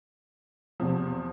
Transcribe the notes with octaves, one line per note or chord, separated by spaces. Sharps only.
E2 C3 F3